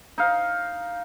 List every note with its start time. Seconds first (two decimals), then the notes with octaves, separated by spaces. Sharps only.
0.18 D#4 F5